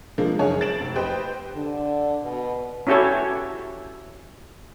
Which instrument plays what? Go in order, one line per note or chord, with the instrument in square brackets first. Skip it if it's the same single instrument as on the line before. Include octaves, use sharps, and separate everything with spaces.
[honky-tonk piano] D3 F3 G#3 A#3
F#1 G#4 C#5
A6 D7 E7 F#7
F1
G4 B4 C5 D#5 G5
[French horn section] D3
B2
[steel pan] C#4 E4 F#4 G4 A4 C#5